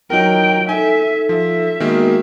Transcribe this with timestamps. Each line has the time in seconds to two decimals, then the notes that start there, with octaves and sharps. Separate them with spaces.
0.10 F#3 D#4 A#4 G5
0.69 D#4 A4 E5 G#5
1.29 F3 E5
1.80 D#3 G#3 A#3 B3 F#4